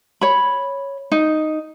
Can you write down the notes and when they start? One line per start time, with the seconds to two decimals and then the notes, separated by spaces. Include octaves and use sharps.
0.21 C#5 B5
1.12 D#4